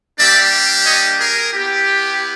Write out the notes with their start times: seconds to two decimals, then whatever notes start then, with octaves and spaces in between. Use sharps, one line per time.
0.19 G3 A#3 D4 G4 D5 E5
0.86 C#5 D#5
1.20 G#4 A#4
1.53 B3 E4 G4